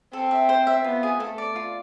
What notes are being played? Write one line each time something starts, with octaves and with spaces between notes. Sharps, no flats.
C4 A4
E5
C5
E5
B3 F4
G#4
A3 A4
D5
F4